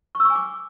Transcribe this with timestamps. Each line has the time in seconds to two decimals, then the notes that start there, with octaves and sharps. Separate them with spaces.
0.15 C#6
0.20 E6
0.25 C#6
0.30 G#5
0.35 D6